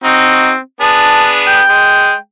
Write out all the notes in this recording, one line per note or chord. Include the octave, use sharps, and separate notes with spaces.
C4 D#4 F#4
B3 D4 G#4 A5
G5
G#3